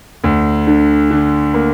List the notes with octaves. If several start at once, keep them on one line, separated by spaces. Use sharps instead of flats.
D2
D3
D3
A#3